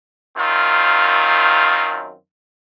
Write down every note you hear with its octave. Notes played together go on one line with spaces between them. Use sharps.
F#2 D#3 C4 F4